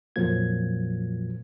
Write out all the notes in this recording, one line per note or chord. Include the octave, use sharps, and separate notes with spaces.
F2 A#2 F3 F#3 A#3 G#6